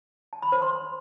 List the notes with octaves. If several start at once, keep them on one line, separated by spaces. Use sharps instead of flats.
A5
B5
C5
C6